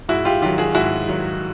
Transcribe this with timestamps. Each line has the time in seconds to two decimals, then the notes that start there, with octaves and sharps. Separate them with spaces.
0.09 G#2 E4 F#4
0.25 F4 G4
0.41 D#3 F#3 F4 G4
0.58 F#4 G#4
0.74 G#2 E4 F#4
1.07 D#3 F#3